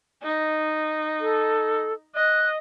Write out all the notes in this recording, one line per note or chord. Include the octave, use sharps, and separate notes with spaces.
D#4
A4
D#5 F#6